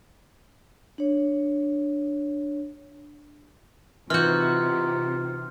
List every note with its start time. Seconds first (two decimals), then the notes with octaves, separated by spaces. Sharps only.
0.98 D4 C#5
4.10 C3 E3 D#4 F4 F#4 F6 G6